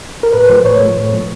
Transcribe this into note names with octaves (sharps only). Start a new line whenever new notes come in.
A#4
A2 B4
F3 A3 C5
A2 C#5
F3 A3
A2
F3 A3